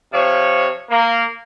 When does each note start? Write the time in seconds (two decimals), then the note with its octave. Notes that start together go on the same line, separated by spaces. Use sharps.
0.11 C3 F3 C#5
0.90 A#3